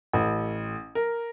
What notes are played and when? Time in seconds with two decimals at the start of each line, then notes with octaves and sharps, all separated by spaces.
0.13 A1
0.95 A#4